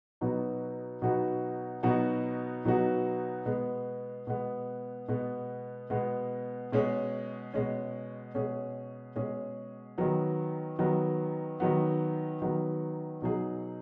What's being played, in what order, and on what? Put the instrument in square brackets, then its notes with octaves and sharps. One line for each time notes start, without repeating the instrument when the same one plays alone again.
[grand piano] B2 F#3 B3 D#4 F#4
B2 F#3 B3 D#4 F#4
B2 F#3 B3 D#4 F#4
B2 F#3 B3 D#4 F#4
B2 G#3 B3
B2 G#3 B3
B2 G#3 B3
B2 G#3 B3
B2 G#3 C#4 G#4
B2 G#3 C#4 G#4
B2 G#3 C#4 G#4
B2 G#3 C#4 G#4
D#3 F#3 B3
D#3 F#3 B3
D#3 F#3 B3
D#3 F#3 B3
B2 F#3 D#4 G#4